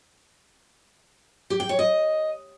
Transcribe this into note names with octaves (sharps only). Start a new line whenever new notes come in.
G4
G5
C#5
D#5